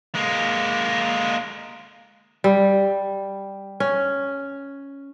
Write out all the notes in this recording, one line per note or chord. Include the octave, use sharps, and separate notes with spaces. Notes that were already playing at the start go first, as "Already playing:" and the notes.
G#3 A#3
G3
C#4